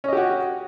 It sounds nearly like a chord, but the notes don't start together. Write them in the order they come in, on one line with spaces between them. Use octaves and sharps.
C#4 D#5 G4 F#4